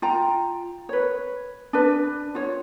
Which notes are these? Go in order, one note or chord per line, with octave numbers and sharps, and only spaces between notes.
F4 G5 A#5
B4 C#5
D4 B4
F4 C#5